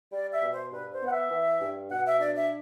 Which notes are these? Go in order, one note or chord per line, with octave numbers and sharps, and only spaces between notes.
G3 D5
E5
B2
C5
G2 B4
C5
B3 F#5
E5
E3
G2
B2 F#5
E5
D4 D5
E5